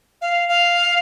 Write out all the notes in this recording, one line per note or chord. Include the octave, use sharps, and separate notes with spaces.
F5
F5